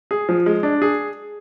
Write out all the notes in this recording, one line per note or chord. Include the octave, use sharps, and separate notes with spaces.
G#4
F3
G#3
D4
G#4